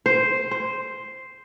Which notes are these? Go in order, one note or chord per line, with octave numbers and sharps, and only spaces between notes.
C5
C5